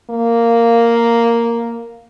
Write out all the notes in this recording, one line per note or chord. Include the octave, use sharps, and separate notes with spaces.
A#3